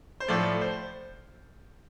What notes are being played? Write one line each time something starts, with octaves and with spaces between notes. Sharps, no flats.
C5
A2 F3 A3 D5
C5